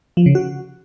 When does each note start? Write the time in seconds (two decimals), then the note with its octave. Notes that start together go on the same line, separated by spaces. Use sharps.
0.17 F3
0.26 C#3
0.35 F#4